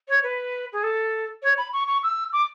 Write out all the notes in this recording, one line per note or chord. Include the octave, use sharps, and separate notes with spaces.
C#5
B4
G#4
A4
C#5
B5
C#6
C#6
E6
D6